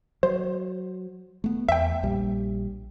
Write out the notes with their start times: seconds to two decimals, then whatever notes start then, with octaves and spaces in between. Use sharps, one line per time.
0.23 F#3 C5
1.44 A3 B3
1.69 E2 E5 G5
2.03 A#1 G3